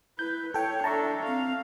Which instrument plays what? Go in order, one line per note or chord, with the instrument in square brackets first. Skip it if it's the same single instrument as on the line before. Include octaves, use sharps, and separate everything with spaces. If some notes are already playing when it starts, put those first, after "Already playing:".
[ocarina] E4 [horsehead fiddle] B4 [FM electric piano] G6
[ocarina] E4 [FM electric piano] A4 G5 [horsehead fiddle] C#5
[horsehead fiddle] D4 A4 [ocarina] E5 [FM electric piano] A5 A#5 C#6
[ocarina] C4 [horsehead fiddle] F5